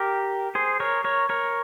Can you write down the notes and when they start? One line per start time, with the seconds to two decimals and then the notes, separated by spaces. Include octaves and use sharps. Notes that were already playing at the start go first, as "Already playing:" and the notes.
Already playing: G4 A#4
0.55 G#4 C5
0.80 A#4 C#5
1.04 A#4 C#5
1.29 A#4 C#5